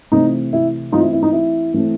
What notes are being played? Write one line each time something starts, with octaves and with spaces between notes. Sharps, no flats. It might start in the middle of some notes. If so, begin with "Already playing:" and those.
C3 E3 A3 C4 D#4
E4
E3 A3 C4 D#4 F4
E4
E4
D#4
E4
E3 A3 C4